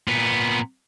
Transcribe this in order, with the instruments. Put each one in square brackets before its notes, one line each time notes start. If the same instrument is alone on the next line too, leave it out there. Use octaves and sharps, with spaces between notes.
[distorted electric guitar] A#2 B3